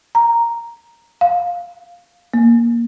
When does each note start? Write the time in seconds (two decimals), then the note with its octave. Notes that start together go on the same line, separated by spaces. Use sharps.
0.15 A#5
1.21 F5
2.34 A#3